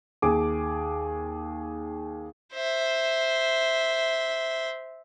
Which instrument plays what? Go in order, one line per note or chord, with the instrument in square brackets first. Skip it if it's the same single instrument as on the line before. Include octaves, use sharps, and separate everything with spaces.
[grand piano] D#2 G#4 D6
[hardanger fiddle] C5 E5